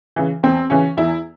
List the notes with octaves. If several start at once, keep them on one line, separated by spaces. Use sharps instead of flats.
C#3 E3
E2 C4
C#3 E3 C#4
E2 E4